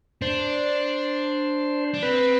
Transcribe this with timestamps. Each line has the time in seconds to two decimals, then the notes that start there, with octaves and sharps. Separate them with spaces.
0.22 D4 C5
1.94 D4
2.03 C4 B4